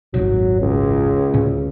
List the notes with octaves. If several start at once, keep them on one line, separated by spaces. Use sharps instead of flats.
D#1 G#1 F#2 F#3
C#2
D2 A2 C#4